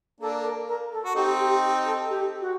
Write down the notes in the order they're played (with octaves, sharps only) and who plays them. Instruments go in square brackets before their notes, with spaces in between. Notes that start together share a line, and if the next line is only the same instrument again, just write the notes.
[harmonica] A#3 D4 [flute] A4
[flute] A#4
A#4
A4
[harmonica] F#4
[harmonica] C4 D#4 [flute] G4
[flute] G4
A4
G4
F#4